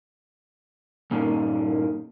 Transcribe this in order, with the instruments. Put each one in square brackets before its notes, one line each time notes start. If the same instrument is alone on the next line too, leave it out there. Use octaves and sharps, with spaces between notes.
[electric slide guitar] G2 A#2 A#3 C#4 D#4